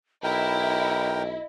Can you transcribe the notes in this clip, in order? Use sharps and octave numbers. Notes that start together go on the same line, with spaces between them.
B1 E4 A#4 D#5 G5